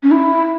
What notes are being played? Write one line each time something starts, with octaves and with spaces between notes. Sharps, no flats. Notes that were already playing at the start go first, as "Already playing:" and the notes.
C#4
E4